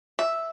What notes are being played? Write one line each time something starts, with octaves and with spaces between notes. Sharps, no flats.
E5